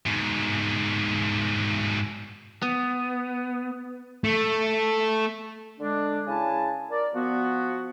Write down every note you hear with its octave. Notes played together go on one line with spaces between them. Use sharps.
G#2 B2
B3
A3
D3 G#3 D4
C#3 E4 G#5 A5
A#4 D5
F3 B3 F#4